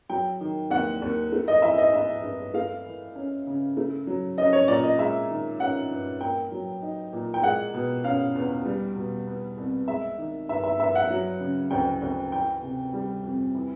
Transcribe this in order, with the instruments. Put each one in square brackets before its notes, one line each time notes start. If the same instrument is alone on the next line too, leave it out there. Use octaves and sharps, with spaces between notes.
[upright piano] F#3 G5
D#3
D#2 F#5
D#2
A3
D#5
E3 E5
D#5
D4 E5
G2
A3 F5
E3
C#4
C#3
A3
F#3
C#4 D#5
C#5
A#2 D5
D#5
G#3 E5
D#3
C#4 F#5
G2
A#3 G5
F#3
D#4
A#2
G5
G#3 F#5
B2
C#4 F5
E2
G3
B2
B3
C2
G#3 E5
D#3
G2 E5
E5
G2 E5
F#5
F#3
C#3
D2 G5
D2
E3 G5
C3
G3
F2
E3